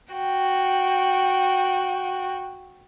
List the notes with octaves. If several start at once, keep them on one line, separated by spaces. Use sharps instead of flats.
F#4 G5